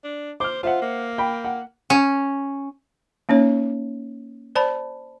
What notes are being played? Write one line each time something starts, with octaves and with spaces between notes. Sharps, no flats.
D4
C5 D6 F6
F4 C5 E5 F#5
A#3
G5 B5
F#5
C#4
A#3 C#4 D#4 C#5
C5 D5 A5 B5